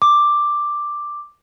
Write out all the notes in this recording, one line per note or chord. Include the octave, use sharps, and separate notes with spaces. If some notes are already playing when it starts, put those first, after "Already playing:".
D6